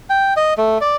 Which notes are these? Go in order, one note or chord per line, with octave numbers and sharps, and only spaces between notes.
G5
D#5
A3
D5